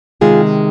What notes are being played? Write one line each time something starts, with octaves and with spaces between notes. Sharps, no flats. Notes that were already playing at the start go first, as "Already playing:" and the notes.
C3 D#3 G#3 F4 G#4